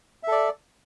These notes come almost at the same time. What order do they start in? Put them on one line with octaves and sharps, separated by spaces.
E5 A4 D5